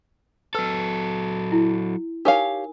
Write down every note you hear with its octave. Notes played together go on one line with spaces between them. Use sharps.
F#3 A4 B4 C6 E6
E4
D#4 G4 A#4 C#5 F5 G#5